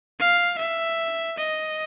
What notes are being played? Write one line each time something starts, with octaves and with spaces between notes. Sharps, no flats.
F5
E5
D#5